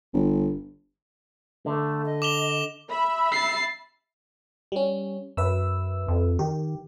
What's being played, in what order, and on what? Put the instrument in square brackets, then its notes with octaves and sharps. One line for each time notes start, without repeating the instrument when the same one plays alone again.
[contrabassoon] G1
[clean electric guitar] D3 [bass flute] A3
[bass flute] D#5
[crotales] D6 F7 G7
[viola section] E5 B5
[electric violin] A6 C7
[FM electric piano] G3 C#4
[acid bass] F#2 [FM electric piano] B4 E5 E6
[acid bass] F2
[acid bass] D#3 [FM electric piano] G4